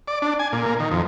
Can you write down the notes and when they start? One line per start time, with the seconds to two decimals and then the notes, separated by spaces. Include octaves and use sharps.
0.08 D5
0.22 D4
0.39 G#5
0.52 A#2
0.66 A#3
0.80 D#3
0.91 F2